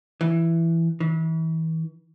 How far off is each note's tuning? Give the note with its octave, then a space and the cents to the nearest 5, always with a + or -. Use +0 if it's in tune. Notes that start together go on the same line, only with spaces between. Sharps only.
E3 +10
E3 -35